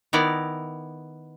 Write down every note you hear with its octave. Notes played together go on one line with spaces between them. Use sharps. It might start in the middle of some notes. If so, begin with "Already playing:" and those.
D#3 B3 E4 D5 A#5